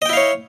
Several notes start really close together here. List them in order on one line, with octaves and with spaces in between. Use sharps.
D#5 G5 E4 F5 C#5